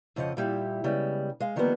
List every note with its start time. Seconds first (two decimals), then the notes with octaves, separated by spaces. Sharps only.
0.16 F2 C#3 F3 D#5 F#5
0.37 A#2 G3 E4 G4
0.84 C#3 G3 G#3 B3
1.40 G#3 F5
1.56 D3 D#3 F3 G3 A#3 B3